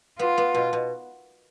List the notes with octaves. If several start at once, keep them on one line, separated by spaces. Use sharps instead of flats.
B3 F4
B3
B2
B2